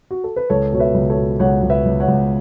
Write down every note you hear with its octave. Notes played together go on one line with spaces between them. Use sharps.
F#4
A4
B4
C#2 A4 C#5
B2 C#5
B4 E5
C#2
A4 C#5
B2
C#2 C#5 F#5
C#2
B4 E5
C#2
C#5 F#5
C#2